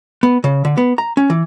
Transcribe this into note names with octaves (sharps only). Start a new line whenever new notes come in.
B3
C#3
D3
B3
A#5
C#4
E3